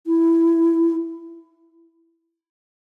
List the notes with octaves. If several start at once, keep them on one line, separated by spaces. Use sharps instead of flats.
E4